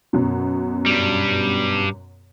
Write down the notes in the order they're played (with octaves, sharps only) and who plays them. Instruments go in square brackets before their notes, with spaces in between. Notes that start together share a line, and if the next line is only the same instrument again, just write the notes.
[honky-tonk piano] F#2 B2
[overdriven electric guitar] G2 G3